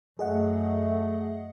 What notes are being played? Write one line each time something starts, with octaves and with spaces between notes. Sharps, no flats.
F#2 A3 G#4 D#5 F#5